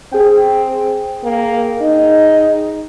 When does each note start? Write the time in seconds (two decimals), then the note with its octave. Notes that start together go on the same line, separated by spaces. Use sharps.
0.12 C4 G#4 G5
1.24 A#3
1.81 D#4